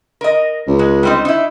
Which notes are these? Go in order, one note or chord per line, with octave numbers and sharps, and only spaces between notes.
A#4 D#5
C#2
G#3
G3 C4 D#4
D#4 E4